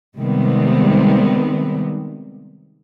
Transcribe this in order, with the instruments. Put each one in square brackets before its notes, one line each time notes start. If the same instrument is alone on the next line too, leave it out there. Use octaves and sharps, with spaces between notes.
[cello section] C3 D#3 G3 G#3 B3 C4